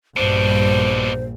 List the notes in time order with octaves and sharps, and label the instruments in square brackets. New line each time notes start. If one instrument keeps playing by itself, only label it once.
[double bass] A#1 [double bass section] G2 [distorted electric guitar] B2 D4 [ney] C5